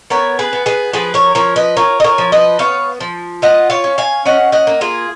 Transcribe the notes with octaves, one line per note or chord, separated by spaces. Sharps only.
B3 A#4 C#5
G#4 B4
B3
G#4 B4
F3 G#4 B4
A#4 C#5
F3 A#4 C#5
B4 D#5
F4 A#4 C#5
D#5
A#4 C#5
F3
B4 D#5
B3 C#5 F5
F3
F4 D#5 F#5
C#5 F5
C#4
F5 G#5
C#4 D#5 F#5
D#5 F#5
A#3
F4 G#4